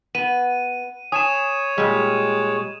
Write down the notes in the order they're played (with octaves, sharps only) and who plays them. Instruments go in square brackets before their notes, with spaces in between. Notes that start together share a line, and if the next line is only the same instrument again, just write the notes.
[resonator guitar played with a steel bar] B3 [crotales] D#7
[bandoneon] C#5 [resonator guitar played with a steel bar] G#5 [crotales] D#6 D#7 E7
[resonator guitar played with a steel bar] A#2 G3 [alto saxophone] G#3